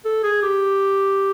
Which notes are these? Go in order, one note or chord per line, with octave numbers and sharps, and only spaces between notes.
A4
G#4
G4